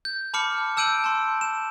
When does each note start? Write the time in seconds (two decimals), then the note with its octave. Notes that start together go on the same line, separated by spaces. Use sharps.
0.05 G6
0.34 A5 B5 D6 F6 C#7
0.77 A5 E6 G6 D7 D#7 F#7
1.04 A5 C6
1.41 E7